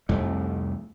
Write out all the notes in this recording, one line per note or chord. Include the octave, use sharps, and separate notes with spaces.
C2 F2 A3